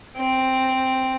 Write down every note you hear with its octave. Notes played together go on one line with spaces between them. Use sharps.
C4